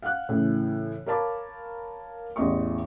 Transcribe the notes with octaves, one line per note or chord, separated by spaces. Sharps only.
F5 F#5 F#6
A2 C#3 E3
A#4 C#5 F5 A5 B5 D6
A1 E2 D#5 C6 C#6